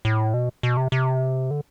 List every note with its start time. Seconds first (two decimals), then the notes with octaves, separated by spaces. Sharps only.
0.05 A2
0.34 B2
0.63 B2
0.77 C3
0.92 C3
1.51 D3